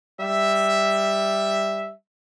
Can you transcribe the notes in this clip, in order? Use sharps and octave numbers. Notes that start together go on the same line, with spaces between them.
G3 E5